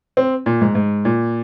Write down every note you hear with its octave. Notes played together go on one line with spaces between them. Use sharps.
C4
A#2
G#2
G#2
A#2